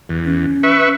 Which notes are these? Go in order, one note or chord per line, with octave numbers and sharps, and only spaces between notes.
E2
C#4
B4 E5 C#6